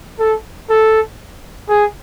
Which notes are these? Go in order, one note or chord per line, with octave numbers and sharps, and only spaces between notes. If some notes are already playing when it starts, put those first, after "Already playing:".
A4
A4
G#4